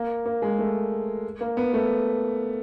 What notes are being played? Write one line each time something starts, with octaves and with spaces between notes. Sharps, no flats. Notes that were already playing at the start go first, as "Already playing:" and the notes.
Already playing: A#3
A#3
G#3
A3
A#3
B3
A3